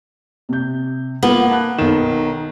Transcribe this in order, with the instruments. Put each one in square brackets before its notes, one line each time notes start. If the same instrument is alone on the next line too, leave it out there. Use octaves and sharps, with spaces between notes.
[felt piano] C3 G6
[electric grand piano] A#3 [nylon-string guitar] B3 [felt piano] F4
[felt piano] A5 B5 F#6
[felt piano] B1 E7 [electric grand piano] D#3